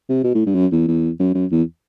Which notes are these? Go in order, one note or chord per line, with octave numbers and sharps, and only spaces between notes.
C3
B2
A2
G2
F#2
E2
E2
F#2
F#2
E2